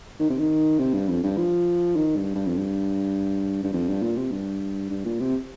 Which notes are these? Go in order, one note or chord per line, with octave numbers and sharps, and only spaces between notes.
D#3
C3
D#3
C3
G2
F2
G2
F3
D#3
G2
G2
F2
G2
G2
F2
G2
A#2
C3
G2
G2
A#2
C3